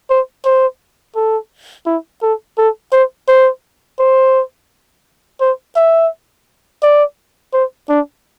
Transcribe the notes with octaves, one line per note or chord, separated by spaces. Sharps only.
C5
C5
A4
E4
A4
A4
C5
C5
C5
C5
E5
D5
C5
D4